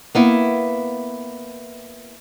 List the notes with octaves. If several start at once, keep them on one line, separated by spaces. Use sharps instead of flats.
A#3 B3 E4